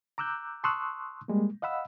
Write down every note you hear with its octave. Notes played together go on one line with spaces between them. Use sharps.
A#5 D6 E6 F#6 G6
A5 C6 C#6 D#6 E6 F#6
G3 G#3 A#3
D#5 F5 F#5 B5 E6